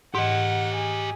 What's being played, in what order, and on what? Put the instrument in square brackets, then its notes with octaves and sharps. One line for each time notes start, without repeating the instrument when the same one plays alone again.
[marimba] G#2 [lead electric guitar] G4 D#5 [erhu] F#5
[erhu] G#4